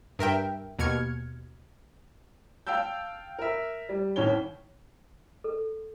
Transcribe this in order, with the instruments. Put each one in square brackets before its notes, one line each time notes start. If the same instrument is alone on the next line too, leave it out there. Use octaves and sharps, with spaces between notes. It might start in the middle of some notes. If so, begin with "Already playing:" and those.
[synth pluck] G2 A#4 E5 G5
D#2 B2 F6 G#6 C#7
[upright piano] F5 G5 A5 E6 G6
A#4 E5
G3
C2 D#3 C#4 C#5 G7
[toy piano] A4